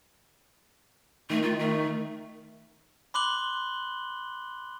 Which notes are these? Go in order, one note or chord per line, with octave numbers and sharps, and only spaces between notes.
D#3 A3
F4
A3
B5 C6 D6 F#6 F#7 G7